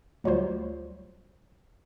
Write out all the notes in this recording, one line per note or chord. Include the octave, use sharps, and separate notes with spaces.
D2 F#3 G3 F4 C5